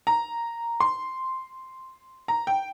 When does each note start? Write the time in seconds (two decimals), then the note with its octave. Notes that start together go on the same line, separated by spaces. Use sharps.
0.07 A#5
0.80 C6
2.28 A#5
2.47 G5